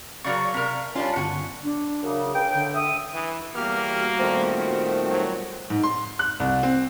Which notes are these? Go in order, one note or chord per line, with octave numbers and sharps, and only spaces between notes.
C#3 F#3 A#4 D5 F5 C#6
C3 A#4
G3 C#4 D4 F4
G1 F#4 G#5
D4
F#2 C#3
C#2 G5
D3
E5 D#6
E3
E2 G3 A#3 B3 F#4 G4 F6
A#2 D#3 A3 C4
F#3
G#2
C6
F#6
C2
C4